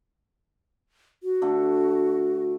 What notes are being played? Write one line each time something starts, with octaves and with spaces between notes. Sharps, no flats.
F#4
D3 A3